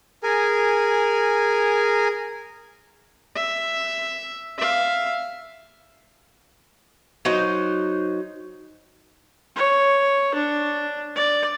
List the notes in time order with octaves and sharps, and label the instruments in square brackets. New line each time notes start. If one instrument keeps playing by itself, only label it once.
[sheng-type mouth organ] G#4 A#4 G#5
[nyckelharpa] E5
E5 F5
[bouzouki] F#3 D#4 C5
[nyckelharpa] C#5
D4
D5